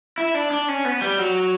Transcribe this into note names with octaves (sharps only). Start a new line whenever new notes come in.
E4
D4
D4
C#4
B3
G3
F#3